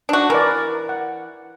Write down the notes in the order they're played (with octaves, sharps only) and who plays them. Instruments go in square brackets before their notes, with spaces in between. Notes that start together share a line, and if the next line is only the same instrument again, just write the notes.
[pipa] D4 F#4
[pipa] E3 [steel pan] A#4 D5
[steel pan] F#5